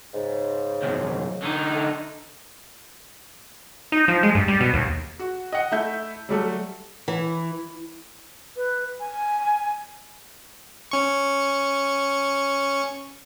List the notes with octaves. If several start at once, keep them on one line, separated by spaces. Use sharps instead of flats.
G#2 C#3
C2 F#2
D3 D#4
A3
D#4
F3
G#3
G2
G3
B2
D#2
F#4
D#5 F#5
A3 E4 E5 G6
F#3 G3 A3
E3
B4
G#5
C#4 C#6